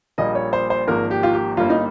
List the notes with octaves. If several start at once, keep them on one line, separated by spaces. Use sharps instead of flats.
A#1 A#2 G3 A#3 D#5
C#5
C5
C5
G#1 G#2 F3 A#3 A#4
G4
F4
G4
G1 G2 G3 A#3 F4
D#4